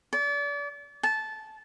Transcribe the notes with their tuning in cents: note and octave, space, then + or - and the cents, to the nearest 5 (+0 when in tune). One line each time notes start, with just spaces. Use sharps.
D5 -35
A5 -15